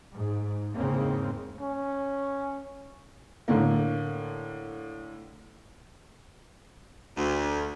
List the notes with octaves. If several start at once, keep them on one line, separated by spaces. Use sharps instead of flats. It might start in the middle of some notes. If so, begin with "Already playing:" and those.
G#2
E2 G#2 C#3 G#3 A#3 C4
C#4
A2 D3 A#3
D2